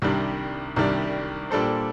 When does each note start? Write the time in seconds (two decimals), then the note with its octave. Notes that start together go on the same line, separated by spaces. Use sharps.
0.02 C2 C3 D#3 G3 D4
0.76 C2 C3 D#3 G3 D4
1.51 A#2 G3 D4 A4 C5